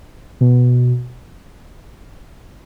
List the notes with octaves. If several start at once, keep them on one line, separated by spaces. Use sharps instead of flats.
B2